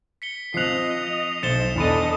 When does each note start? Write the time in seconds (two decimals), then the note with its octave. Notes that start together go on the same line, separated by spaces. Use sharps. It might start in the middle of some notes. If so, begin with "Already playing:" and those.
0.22 B6 C#7 G7
0.54 F3 C4 D#5 F#6 C7 F7
1.43 B1 C5 A6 C#7 E7 G7
1.76 E2 D4 A4 D#5 B5 D#7